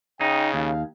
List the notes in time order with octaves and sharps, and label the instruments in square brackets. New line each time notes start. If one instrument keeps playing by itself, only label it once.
[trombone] C#3 [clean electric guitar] D#4 [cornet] G5
[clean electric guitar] D#2 [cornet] F5